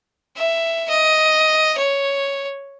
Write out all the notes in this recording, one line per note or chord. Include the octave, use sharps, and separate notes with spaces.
E5
D#5
C#5